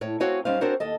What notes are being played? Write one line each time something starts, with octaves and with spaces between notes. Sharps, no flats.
A2 C#5
C4 F#4 C#5 F5 G#5
F#2 G3 C#4 D#4 C5 F5
C4 D4 F#4 A#4 C5 C#5
D#2 A4 D#5